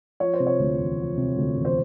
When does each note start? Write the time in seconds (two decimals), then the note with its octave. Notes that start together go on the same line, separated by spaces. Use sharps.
0.20 F3 C#5
0.33 C5
0.40 C3
0.47 C#5
0.59 D2
0.79 E1
0.98 F3
1.17 C3
1.37 D2
1.56 E1
1.65 C5